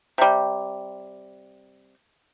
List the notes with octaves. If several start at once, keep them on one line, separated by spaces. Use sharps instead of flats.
C3 G3